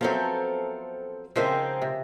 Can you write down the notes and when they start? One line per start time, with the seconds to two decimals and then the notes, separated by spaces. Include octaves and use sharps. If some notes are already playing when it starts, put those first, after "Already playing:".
0.01 F3 F#3 B3 C4 A4 A#4 C5 E5
1.36 C#3 F3 G#3 C4 D#4 A#4 C5 E5
1.82 C3